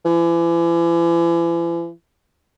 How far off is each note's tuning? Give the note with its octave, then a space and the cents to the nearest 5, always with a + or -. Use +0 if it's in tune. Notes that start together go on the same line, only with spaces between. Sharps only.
E3 +40